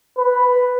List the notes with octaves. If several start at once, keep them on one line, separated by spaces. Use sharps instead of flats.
B4